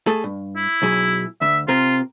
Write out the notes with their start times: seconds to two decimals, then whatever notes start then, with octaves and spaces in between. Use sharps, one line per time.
0.07 A3 G#4 A4
0.24 G2
0.56 E4
0.82 B1 F#3 G#4
1.41 D2 E5
1.68 C3 C4 F4 A#4